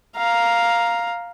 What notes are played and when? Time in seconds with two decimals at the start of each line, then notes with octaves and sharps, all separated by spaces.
0.16 F5 A#5